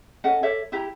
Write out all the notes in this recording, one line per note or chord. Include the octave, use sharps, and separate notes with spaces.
C#4 A4 D#5 F#5
A4 C#5 D5 E5
E4 G4 A#5